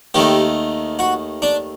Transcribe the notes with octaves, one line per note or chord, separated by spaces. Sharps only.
D#2 D#3 A3 G4
F#4
D4